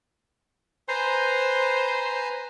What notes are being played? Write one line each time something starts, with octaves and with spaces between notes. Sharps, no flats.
B4 C5 G#5 A#5